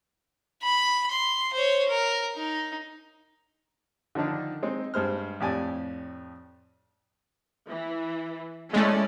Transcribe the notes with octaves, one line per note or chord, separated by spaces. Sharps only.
B5
C6
C5 C#5
A#4
D#4
D3 D#3 F3 D4 D#4
G#3 C4 D#4
G2 G#3 C5 F6
F2 A2 G4 D5 G#5
E3
G#3 A3 C#4 E4 D5